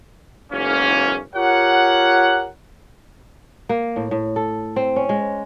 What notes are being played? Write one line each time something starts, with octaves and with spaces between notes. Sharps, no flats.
F#1 B1 E2 G#2 A#3 C#4
F4 G4 A#4 C#5 F#5
A#3
A2
A2
A4
C4
C#4
G#3